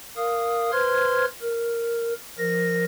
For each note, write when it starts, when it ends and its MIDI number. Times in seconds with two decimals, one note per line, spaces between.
0.16 0.71 70
0.16 0.71 77
0.16 0.71 87
0.72 1.25 71
0.72 1.25 72
0.72 1.25 84
0.72 1.25 89
0.72 1.25 92
1.41 2.14 70
2.38 2.85 53
2.38 2.85 70
2.38 2.85 94